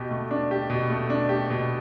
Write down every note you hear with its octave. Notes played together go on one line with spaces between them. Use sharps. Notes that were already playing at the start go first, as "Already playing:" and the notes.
Already playing: B2 G4
A3
D4
G4
B2
A3
D4
G4
B2